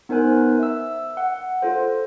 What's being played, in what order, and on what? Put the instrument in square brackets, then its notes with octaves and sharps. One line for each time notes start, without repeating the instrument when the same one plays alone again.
[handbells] B3 D#4 A#4 C5 G#5 F#6
E5 E6
F#5
F4 A4 C5